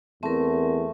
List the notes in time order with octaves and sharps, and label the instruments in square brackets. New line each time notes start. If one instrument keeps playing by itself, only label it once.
[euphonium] E2 [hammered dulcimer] A3 [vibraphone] C4 A#4